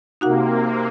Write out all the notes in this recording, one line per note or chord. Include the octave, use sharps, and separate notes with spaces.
C3 A#3 D#4 F#4 F#5